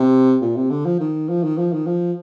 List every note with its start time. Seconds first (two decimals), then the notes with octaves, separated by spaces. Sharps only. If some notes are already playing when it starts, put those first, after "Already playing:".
Already playing: C3
0.42 A#2
0.57 C3
0.71 D3
0.85 F3
1.00 D#3
1.30 F3
1.44 D#3
1.58 F3
1.73 D#3
1.87 F3